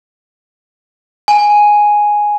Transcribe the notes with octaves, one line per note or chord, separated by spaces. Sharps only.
G#5